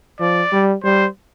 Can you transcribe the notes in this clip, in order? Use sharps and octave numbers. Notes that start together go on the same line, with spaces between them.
F3 D5
G3
G3 C5